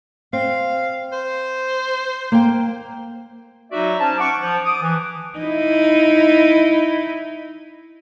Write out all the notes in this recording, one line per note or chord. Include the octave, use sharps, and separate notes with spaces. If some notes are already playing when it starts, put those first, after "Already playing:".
C4 F5
C5
A#3 G5
F#3 D#4 F#4 D5 E5
C#4 C5 A5
F#5 C#6 D6
F3
D6 D#6
E3
D#4 E4